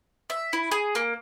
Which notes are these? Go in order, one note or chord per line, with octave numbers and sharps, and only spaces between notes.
E5
E4
G#4
A#3